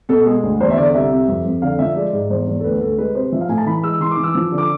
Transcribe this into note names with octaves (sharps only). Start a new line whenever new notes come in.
B2 A4
G#3 G#4
D2
E2 C5
E5
D3 D5
C2 E5
C3
F2
F2
D3 F5
F3 E5
G#3 D5
G#2
E2 C5
E2
A4
D2 B4
D2 A4
G#3 B4
C3 C5
F3 E5
F5
A2 G#5
A5
E3 B5
G#3 E6
E3 C6
D6
E3
E6
F3
D3
D6